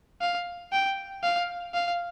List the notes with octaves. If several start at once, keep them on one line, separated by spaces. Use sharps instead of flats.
F5
G5
F5
F5